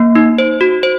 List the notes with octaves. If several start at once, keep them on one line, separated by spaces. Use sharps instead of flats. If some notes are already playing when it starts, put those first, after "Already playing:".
Already playing: A#3
D#4
C5
F#4
C5